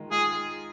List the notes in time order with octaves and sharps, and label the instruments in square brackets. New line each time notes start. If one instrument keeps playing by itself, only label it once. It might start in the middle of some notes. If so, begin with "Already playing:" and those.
Already playing: [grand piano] D#3 G#3 F4
[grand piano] G#3 F4 [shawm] G#4